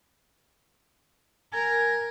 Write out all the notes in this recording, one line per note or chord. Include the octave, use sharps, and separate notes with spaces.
A#4 G#5